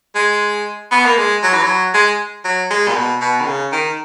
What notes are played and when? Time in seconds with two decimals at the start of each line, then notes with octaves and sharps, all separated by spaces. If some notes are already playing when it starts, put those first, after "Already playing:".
0.15 G#3
0.91 B3
1.05 A#3
1.17 G#3
1.43 F#3
1.53 E3
1.63 F#3
1.94 G#3
2.44 F#3
2.70 G#3
2.88 A#2
2.95 B2
3.21 B2
3.41 D#3
3.46 C#3
3.72 D#3